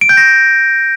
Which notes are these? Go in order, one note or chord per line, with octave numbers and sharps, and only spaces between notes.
D7
G6
A#6